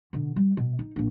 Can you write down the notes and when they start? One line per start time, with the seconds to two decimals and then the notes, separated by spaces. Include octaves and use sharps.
0.13 B2 D3
0.36 G3
0.57 B2
0.79 D#4
0.96 A#1 A#2